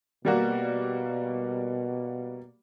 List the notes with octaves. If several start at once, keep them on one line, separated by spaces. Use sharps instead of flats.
B2 G3 A#3 F#4